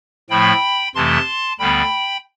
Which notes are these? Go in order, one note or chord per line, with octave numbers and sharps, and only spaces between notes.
A2 F3 A3 G5 B5
F2 C3 E3 A3 A5 C6
D2 D3 G3 B3 G5 B5